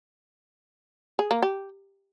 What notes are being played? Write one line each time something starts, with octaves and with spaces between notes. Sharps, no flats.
G#4
A#3
G4